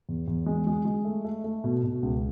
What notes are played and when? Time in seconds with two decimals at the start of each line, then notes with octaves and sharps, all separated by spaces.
0.09 E2
0.28 E2
0.46 G#3
0.67 G#3
0.85 G#3
1.05 A3
1.25 A3
1.44 A3
1.64 B2
1.84 B2
2.03 C#2